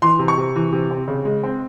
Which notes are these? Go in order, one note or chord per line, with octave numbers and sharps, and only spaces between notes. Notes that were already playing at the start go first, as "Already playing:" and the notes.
E3 C6
C3
C#6
C3
E3
C3
C4
C#3
G#3
C4